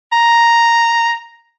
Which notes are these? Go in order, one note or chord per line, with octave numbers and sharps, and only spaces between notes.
A#5